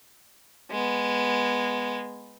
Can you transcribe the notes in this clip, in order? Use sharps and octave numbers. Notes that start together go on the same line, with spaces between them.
G#3 B3